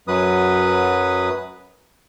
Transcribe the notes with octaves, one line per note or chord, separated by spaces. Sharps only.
F#2 F#3 B4 D#6